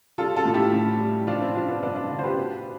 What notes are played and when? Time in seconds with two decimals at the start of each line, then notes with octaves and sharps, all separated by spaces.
0.18 G3 F4 A4
0.36 F4 A4
0.45 A2
0.54 E4 G4
0.73 A2
1.00 G3
1.27 F3 D4 F4
1.41 C4 E4
1.55 F3 D4 F4
1.68 B3 D4
1.83 G2 B3 D4
1.96 D4 F4
2.10 D3
2.19 C5
2.23 G4 B4
2.37 B2